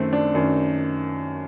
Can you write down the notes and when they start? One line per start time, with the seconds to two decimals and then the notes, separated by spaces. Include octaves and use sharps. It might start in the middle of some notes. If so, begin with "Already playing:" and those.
Already playing: F#2 D#3 A3 C4
0.13 D4
0.34 F#2 D#3